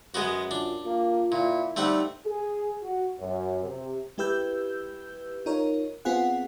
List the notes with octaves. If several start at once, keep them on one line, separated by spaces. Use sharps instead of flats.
F#2 G#3 B3 F#4
D4 F4
A#3 F4
A#2 E4
G3 A3 C4 D#4 F#5
G#4
F#4
F#2
C3
G#3 E4 G4 B4 E6 G6
D#4 F4 A#4 C#5
B3 C4 F4 G#4 F#5